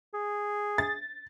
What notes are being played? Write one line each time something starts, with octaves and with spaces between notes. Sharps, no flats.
G#4
A6